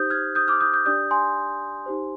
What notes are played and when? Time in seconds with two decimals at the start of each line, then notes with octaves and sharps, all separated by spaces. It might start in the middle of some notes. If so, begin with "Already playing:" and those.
Already playing: D#4 G4 C5 D#6 G6
0.10 F6 G#6
0.35 D#6 G6
0.48 D6 F6
0.61 D#6 G6
0.73 D#6 G6
0.85 D4 G4 D5 D#6 G6
1.11 G#5 C6
1.86 D#4 G4 C5